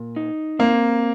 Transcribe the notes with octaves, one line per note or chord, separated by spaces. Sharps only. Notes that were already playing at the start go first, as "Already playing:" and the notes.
Already playing: A#2
D#4
A#3 C4